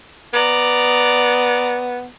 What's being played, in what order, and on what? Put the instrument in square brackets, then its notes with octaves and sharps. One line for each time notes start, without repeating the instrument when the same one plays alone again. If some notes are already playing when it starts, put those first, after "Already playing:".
[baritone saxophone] B3 [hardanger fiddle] D5 A#5